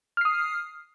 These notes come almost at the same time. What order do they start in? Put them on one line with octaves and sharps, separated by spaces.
F6 C7 D#6